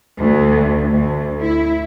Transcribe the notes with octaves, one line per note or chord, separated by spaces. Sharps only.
D2
D2
E4